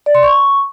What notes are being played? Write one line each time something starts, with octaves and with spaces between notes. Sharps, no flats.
D5
C6
C#6